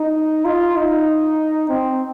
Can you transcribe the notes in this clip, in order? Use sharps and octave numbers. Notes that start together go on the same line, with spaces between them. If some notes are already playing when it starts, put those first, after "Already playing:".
Already playing: D#4
F4
D#4
C4